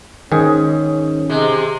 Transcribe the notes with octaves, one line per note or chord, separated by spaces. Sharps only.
G#2 D#3 C#4 G#4
C3 G#3